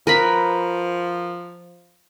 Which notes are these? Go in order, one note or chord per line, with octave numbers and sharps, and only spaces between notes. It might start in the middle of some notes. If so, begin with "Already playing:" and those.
F3 A#4 B4 B5